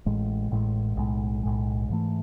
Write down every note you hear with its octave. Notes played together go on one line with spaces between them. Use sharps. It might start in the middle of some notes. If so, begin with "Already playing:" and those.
A1 A2 G#3
A1 A2 G#3
B1 A2 G#3
B1 A2 G#3
G#2 E3 A3